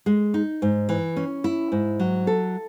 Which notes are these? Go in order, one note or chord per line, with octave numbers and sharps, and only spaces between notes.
G#3
D#4
G#2
E3
C#4
E4
G#2
F#3
A4